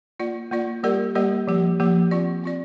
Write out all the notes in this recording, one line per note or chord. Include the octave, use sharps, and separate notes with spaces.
A#3 F4 D5
A#3 F4 D5
G3 A#3 G4 A#4 D5
G3 A#3 G4 A#4 D5
F3 A#3 G4
F3 A#3 G4
C4 F4 D5
C4 F4 D5